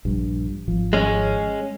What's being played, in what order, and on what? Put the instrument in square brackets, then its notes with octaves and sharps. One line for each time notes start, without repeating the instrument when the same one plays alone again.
[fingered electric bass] A#1 G2
G#1 F3
[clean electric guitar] G#3 C#4